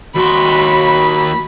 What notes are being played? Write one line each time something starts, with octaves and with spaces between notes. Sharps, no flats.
D#2 F#4 B5 C6